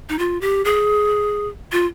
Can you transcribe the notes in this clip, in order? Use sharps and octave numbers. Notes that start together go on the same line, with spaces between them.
D#4
F4
G4
G#4
F4